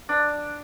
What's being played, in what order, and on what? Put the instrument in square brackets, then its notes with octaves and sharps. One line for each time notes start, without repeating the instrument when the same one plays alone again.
[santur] D4